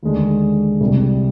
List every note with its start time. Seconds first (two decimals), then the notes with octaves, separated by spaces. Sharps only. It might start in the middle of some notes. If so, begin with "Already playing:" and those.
0.03 D#2 D3 G#3 D4
0.81 C2 C3 G3